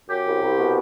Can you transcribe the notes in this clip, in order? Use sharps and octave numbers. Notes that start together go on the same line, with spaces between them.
F#2 G4
C2
C2
B2